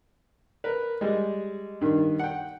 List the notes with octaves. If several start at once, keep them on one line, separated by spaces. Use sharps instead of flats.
A#4 B4
G3 G#3
G2 D#3
F#5 G5